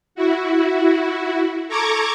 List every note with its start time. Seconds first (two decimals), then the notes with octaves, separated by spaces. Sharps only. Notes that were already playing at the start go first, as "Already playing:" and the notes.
0.15 E4 F#4
1.68 A4 A#5 C#6 D6 G#6